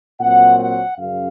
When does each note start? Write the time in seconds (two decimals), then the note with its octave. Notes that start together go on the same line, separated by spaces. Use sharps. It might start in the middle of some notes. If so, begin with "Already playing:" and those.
0.19 A#2 F#3 C4 F#5
0.59 F#5
0.97 F#2 C#3 F5